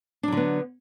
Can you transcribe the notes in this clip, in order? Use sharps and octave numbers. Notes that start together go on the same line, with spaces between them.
D3 F#3 B3 D4